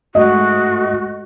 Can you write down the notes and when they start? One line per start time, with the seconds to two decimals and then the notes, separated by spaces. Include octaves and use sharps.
0.15 G#2 A3 F#4 D#5